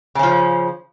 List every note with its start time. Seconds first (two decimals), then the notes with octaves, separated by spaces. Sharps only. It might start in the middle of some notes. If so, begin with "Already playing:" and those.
0.15 C#3
0.19 C#4
0.23 F3